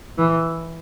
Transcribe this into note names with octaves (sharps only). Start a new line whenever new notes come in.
E3